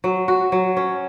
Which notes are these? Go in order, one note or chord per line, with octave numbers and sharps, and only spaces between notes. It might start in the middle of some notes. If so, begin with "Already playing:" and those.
F#3
F#4
F#3
C#4